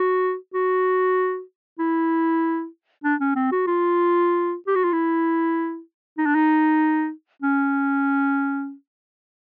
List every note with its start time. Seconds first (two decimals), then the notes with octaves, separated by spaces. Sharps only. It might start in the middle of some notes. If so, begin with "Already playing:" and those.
Already playing: F#4
0.54 F#4
1.79 E4
3.04 D4
3.20 C#4
3.36 C4
3.52 F#4
3.67 F4
4.67 G4
4.76 F#4
4.84 F4
4.93 E4
6.18 D#4
6.26 D4
6.35 D#4
7.42 C#4